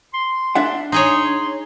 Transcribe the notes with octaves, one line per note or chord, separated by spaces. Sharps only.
C6
D4 E5 F#5
D#4 G#4 C#5 C6